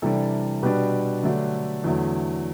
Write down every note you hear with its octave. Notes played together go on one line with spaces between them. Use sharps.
C3 E3 G3 D4 A4
B2 G3 D4 G4 B4
D3 F#3 A3 D4
E2 D3 F#3 A3